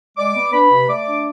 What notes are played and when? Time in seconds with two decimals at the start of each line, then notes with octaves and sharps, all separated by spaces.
0.17 G#3 D5 D6
0.35 B3
0.52 D4 B4 B5
0.71 C3
0.88 A3 D5 D6
1.06 D4